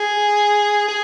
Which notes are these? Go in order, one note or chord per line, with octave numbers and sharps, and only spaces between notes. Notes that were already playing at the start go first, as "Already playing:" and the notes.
Already playing: G#4
G#4